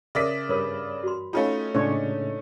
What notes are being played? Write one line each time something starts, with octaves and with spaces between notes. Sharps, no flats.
C#3 A#4 D5 E5 B6
G2 A#4 B4 C#5 B5
F#4 C6
A3 C#4 D#4 F4 G#4 F5
A2 C#3 G#3 D4 C#5